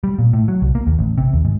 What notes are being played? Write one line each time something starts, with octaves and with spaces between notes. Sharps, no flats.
G3
A#2
A2
F#3
C2
A#3
D#2
A1
C3
D#2
G#2